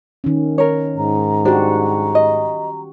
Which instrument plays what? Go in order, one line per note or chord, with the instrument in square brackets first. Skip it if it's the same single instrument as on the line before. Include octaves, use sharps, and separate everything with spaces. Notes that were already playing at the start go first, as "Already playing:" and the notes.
[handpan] D#3 C#4
[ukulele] A#4 C#5
[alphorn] G#2 [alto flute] A#5
[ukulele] D4 C5 [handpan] F#4 G4
[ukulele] D#5